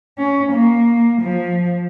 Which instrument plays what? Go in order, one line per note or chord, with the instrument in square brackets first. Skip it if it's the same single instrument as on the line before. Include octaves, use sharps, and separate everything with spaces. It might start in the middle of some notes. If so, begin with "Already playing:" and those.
[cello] C#4
A#3
F3